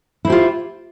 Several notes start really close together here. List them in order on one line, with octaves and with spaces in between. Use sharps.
E4 C5 G4 F4